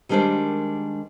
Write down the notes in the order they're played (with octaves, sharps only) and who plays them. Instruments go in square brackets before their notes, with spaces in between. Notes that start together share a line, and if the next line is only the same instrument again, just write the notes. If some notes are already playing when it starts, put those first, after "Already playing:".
[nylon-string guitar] D#3 G3 G#3 D4 A#4 C5